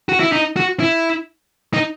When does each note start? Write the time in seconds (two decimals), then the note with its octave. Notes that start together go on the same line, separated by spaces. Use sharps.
0.09 F#4
0.20 E4
0.32 D#4
0.56 F#4
0.80 E4
1.74 D#4